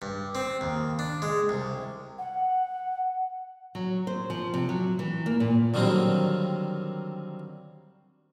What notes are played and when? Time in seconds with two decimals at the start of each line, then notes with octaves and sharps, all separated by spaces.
0.02 G2
0.35 C4
0.61 D#2
0.99 D4
1.22 G#3
1.49 C2
2.18 F#5
3.75 F#3
4.07 C5
4.30 F3
4.54 C3
4.69 F#3
4.99 E3
5.26 A#3
5.40 A#2
5.74 D3 D#3 F#3 G3 A#3 C4